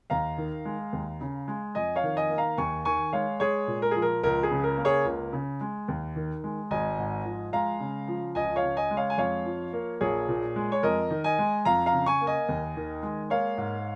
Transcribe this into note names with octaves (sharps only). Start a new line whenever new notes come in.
D#2 F5 A#5
D#3
G#3
D#2
C#3
G#3
F2 D#5 G#5
C#5 F5
D#3
D#5 G#5
A#3
F5 A#5
D#2 G#5 C#6
D#3 G#5 C#6
G#3 C#5 F5
G#3 G#4 C#5
A#2
A#4
F3 G#4
A#4
C#2 A#4
G#4
C#3
A#4
A#3
G#4 C#5
C#2
C#3
G#3
D#2
D#3
G#3
G#1 D#5 G#5
G#2
F3
G#3 F5 A#5
C#3
F3
C#2 D#5 G#5
C#5 F5
C#3
D#5 G#5
G#3
C#5 F5
G#5
F2 C#5 F5
F3
A#3
A#1 G#4 C#5
A#2
G#3
C#5
F2 A#4 D#5
D#3
D#5 G#5
G#3
F2 F5 A#5
F5 A#5
C#3
G#5 C#6
A#3
D#5 G#5
D#2
D#3
G#3
A#3 C#5 F5
G#2